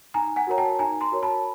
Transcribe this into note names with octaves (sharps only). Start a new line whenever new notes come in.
D#4 G#5 A#5
F#5 G#5
F#4 A#4 C#5 A#5
G5 A5
D#4 G#5 A#5
A#5 C6
F#4 A#4 C#5
A5 B5